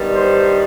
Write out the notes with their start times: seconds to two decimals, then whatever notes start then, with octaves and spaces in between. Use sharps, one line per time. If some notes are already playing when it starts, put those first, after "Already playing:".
Already playing: G2 D#3 G3 B3
0.14 C5